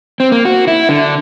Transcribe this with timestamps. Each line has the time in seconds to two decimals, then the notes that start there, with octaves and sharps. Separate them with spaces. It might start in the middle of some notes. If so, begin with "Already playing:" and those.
0.20 C4
0.32 A#3
0.45 F#4
0.68 E4
0.89 D3